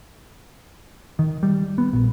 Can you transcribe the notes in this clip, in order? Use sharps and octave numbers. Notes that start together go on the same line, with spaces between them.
D#3
G3
B3
A#1